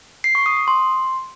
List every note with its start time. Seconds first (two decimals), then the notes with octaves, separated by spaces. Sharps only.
0.24 C7
0.35 C#6
0.46 D#6
0.57 D#6
0.68 C6